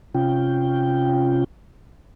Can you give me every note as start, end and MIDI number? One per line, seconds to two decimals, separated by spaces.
0.14 1.44 48
0.14 1.44 61
0.14 1.44 65
0.14 1.44 79